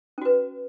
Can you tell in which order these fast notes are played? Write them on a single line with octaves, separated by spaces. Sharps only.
C#4 F#4 B4